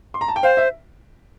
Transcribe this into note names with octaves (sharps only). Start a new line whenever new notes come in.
C6
A#5
A5
G5
C5 F5
E5